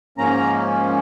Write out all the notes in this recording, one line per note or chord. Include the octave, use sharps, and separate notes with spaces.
G#2 F3 A#3 C#4 A#5